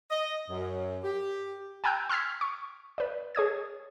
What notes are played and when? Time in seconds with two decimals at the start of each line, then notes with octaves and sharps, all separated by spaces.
0.11 D#5
0.49 F#2
1.03 G4
1.84 G5 G#5 A#5 E6 F#6 G6
2.09 C6 E6 F6 G#6 B6
2.41 C#6
2.98 B4 D5
3.35 G#4 C#5 D#6 G#6